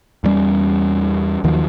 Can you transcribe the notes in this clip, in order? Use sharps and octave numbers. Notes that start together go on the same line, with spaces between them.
E2 G2 G3 C#4
D#2 D#3 F3 F#3